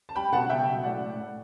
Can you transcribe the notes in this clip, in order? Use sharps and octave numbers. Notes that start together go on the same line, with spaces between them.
A5
G3 G5 B5
B2 F#5 A5
C#3 E5 G5
F#3
A2 D5 F#5
A2
A2